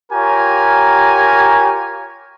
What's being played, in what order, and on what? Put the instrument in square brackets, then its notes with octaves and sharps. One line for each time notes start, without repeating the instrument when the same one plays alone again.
[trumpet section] F4 G4 A#4 C#5 G#5 A#5